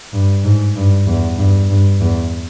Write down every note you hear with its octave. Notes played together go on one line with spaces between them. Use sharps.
G2
G#2
G2
E2
G2
G2
E2